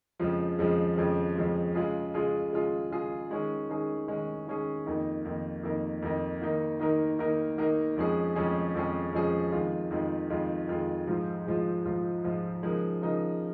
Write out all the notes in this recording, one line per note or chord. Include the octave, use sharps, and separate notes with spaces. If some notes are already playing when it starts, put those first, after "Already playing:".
F2 C#3 F3 G#3
F2 C#3 F3 G#3
F2 C#3 F3 G#3
F2 C#3 F3 G#3
C#3 G#3 F4 G#4
C#3 G#3 F4 G#4
C#3 G#3 F4 G#4
C#3 G#3 F4 G#4
D#3 G#3 C#4 G#4
D#3 G#3 C#4 G#4
D#3 G#3 C#4 G#4
D#3 G#3 C#4 G#4
F2 D#3 A#3 D#4
F2 D#3 A#3 D#4
F2 D#3 A#3 D#4
F2 D#3 A#3 D#4
D#3 A#3 D#4 A#4
D#3 A#3 D#4 A#4
D#3 A#3 D#4 A#4
D#3 A#3 D#4 A#4
F2 F3 G#3 C#4 G#4
F2 F3 G#3 C#4 G#4
F2 F3 G#3 C#4 G#4
F2 F3 G#3 C#4 G#4
F2 D#3 G#3 F4
F2 D#3 G#3 F4
F2 D#3 G#3 F4
F2 D#3 G#3 F4
G#2 F3 G#3 F4
G#2 F3 G#3 F4
G#2 F3 G#3 F4
G#2 F3 G#3 F4
C#3 F3 G#3 D#4 A#4
C#3 F3 G#3 D#4 A#4